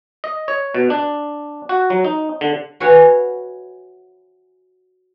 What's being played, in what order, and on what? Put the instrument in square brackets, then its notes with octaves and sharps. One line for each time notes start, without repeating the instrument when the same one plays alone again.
[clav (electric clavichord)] D#5
C#5
B2
D4
F#4
F#3
D#4
D3
[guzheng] F#4 B4 C#5 E5 F5 G#5